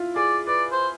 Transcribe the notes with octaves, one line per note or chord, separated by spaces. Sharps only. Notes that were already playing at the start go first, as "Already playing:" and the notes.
Already playing: E4 F4
G#4 D5
B4 D5
C5